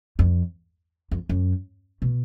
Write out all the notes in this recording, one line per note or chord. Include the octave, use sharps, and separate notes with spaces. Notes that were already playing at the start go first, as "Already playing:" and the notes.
F2
F2
F#2
B2